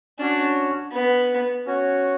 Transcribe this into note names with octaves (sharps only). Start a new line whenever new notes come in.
C#4 D4 F#4 C#5
B3
C#4 F#4 C#5